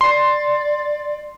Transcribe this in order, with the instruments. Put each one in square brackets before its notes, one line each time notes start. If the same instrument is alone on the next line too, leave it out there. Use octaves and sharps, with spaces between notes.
[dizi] D5 [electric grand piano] C6